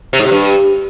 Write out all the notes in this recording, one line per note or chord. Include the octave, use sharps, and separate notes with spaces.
C3
G#2
C3
G2